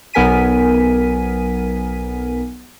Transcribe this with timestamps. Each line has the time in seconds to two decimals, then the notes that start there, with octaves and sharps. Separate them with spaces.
0.14 B1 B3 A#4 G#5 B6 D#7